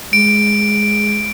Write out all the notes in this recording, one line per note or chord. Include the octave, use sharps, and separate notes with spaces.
G#3 D7